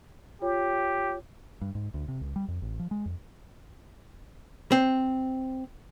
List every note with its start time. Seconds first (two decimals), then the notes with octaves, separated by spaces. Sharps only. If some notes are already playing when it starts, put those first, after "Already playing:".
0.42 F4 G4 C#5
1.61 G2
1.75 G#2
1.94 D2
2.08 C3
2.21 C#2
2.36 G3
2.48 F2
2.62 A1
2.79 F3
2.91 G#3
3.05 F2
4.72 C4